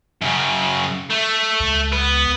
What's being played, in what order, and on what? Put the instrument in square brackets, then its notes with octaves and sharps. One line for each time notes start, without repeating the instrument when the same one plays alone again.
[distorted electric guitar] F#2 C#3
A3
[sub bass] C#2
[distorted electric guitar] B3 B4